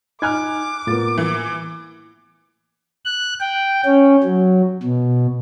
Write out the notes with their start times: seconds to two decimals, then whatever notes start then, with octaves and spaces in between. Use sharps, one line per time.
0.22 D#4 G#5 D6 F6 F#6 G#6
0.87 A2 A#3 B3 F4 A6
1.18 E3
3.05 F#6
3.41 G5
3.85 C#4
4.24 F#3
4.83 B2